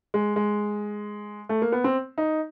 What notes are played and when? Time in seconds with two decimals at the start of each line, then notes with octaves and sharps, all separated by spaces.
0.14 G#3
0.36 G#3
1.49 A3
1.62 A#3
1.72 B3
1.84 C4
2.18 D#4